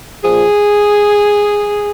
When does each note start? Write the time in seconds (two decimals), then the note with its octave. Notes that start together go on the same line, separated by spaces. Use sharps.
0.24 A#2 F3 G#4